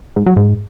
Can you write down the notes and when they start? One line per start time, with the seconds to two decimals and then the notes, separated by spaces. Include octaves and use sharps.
0.16 G#2
0.26 F#3
0.37 G#2